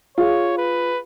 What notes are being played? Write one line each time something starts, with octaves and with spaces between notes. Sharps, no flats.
F4 G#4 C#5
B4